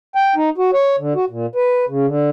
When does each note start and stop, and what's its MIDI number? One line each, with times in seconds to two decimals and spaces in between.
0.15 0.34 79
0.36 0.50 63
0.58 0.71 66
0.74 0.96 73
0.99 1.13 50
1.15 1.25 66
1.30 1.46 46
1.55 1.85 71
1.89 2.06 49
2.07 2.30 50